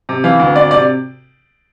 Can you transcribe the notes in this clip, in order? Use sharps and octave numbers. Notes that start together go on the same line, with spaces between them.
C3
E3 F5
D2
D2 D5
C3 D5